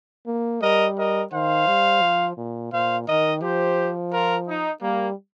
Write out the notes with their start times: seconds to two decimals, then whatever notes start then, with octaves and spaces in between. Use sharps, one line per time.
0.27 A#3
0.61 G3 A#4 D#5
0.97 A#4 D#5
1.32 D#3 C5 F5
1.67 G3
2.01 F3
2.37 A#2
2.72 A#2 C5 F5
3.07 D#3 A#4 D#5
3.42 F3 G4 C5
4.12 F4 A#4
4.48 D#4
4.82 G3 A#3